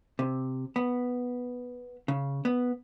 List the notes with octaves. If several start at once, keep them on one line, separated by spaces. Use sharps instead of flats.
C3
B3
C#3
B3